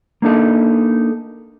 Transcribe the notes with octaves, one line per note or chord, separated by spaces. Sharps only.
A#3 D4 D#4 A4